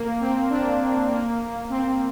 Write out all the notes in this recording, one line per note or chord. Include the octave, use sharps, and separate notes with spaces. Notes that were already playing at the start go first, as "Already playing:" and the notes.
Already playing: A#3
C4
D4
A#3
A#3
C4